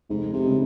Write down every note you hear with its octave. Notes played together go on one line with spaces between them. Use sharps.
F1 G#2
C3
C#3 G#3